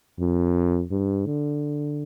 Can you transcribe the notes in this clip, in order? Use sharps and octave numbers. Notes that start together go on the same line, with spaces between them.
F2
G2
D3